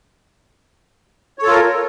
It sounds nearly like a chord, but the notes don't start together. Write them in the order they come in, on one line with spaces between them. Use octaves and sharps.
C#5 A4 F4 A#4